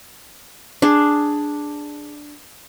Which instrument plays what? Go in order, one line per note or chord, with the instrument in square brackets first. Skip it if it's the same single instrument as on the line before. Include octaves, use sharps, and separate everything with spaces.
[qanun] D4 G#4